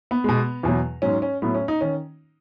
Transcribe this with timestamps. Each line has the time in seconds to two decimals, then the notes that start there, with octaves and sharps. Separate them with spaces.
0.11 B3
0.24 B2 G#3
0.63 E2 B2 F#3
1.02 G#2 F#3 C#4
1.22 C#4
1.42 A2 F#3 B3
1.55 C#4
1.68 D#4
1.81 D#3 C#4